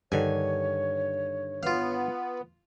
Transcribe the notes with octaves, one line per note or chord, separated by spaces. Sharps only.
G2 D3 D#3 C#5 G#5
B3 F4 F5